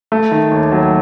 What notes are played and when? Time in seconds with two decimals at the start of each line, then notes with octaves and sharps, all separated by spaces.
0.12 A3
0.31 D#3
0.52 D#2
0.72 F#3